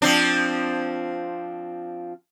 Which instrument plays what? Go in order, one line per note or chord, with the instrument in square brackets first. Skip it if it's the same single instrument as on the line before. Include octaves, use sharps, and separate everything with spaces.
[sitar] F3 C4 D4